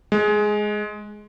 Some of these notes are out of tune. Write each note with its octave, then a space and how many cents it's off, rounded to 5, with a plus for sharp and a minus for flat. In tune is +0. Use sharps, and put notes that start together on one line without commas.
G#3 +10